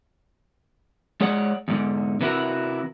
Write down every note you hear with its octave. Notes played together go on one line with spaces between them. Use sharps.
G#3 G#4 C#5 D5 F#5
E2 G#2 D3
C3 E3 B3 E4 F#4 A#4